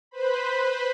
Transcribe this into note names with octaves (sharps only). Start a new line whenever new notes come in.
B4 C5 B5